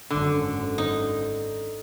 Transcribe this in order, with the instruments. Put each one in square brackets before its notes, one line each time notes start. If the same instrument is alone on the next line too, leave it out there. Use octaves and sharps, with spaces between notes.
[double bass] G#1 F#2 [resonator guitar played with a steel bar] D3
[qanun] D#4